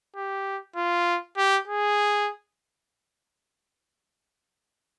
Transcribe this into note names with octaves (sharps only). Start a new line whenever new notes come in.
G4
F4
G4
G#4